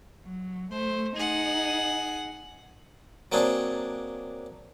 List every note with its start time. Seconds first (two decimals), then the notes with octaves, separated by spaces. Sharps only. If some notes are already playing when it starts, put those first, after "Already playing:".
0.24 F#3
0.71 A3 C5
1.16 D#4 G#4 F#5
3.32 F#3 A#3 C4 D4 G#4